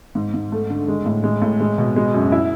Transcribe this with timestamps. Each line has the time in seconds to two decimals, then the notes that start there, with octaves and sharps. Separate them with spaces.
0.15 G#2
0.34 G#2
0.52 A3
0.70 D3
0.88 G#3
1.06 A2
1.24 G#3
1.42 A2
1.60 G#3
1.78 B2
1.96 G#3
2.14 F#2
2.32 E4